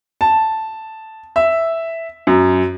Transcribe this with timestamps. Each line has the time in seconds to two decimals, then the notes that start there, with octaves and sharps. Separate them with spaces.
0.21 A5
1.36 E5
2.27 F#2